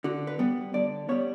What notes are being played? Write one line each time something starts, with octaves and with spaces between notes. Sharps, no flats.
D3 F#4
B4
G3 B3
D3 D5
G3 B3 C#5